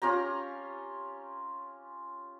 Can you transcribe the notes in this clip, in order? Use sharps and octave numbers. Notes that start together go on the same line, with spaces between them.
C#4 F4 G4 A#5